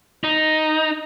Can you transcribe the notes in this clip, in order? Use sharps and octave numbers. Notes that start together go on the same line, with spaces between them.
D#4